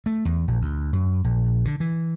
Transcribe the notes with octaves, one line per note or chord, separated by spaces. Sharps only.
A3
E2
A#1
D2
F#2
A#1
D3
E3